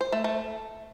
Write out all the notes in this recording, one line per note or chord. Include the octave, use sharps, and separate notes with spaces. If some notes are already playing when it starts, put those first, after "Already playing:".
C5
A3
A3